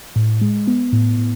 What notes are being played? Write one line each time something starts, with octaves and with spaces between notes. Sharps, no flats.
A2
G#3
B3
A2
A2